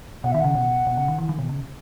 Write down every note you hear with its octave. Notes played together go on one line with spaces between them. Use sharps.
B2 F#5
D#3 E5
C#3 F#5
B2
B2
C#3
D#3
E3
D#3
B2
C#3